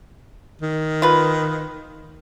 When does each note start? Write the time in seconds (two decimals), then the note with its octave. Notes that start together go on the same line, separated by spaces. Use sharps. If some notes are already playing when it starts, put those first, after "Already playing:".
0.61 D#3
1.02 F4 B4